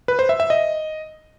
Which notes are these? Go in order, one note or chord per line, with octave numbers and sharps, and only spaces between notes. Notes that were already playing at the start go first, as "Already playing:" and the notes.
B4
C5
E5
E5
D#5